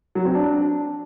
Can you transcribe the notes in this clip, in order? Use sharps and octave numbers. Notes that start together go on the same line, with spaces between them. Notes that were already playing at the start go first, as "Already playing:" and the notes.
F#3
C4
D4